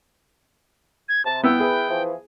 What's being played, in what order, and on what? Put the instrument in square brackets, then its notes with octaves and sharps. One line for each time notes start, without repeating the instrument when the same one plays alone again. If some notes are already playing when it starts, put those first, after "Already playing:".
[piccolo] G#6
[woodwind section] C3 [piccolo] A5
[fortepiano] B3 E4 E6 [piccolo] G5
[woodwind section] E4 B4 [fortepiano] G#4
[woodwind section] E3 F3